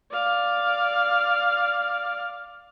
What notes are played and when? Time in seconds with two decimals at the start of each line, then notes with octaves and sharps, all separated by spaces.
0.11 D5 F5